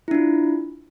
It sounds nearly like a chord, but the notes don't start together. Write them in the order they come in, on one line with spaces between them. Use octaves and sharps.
E4 D4 F4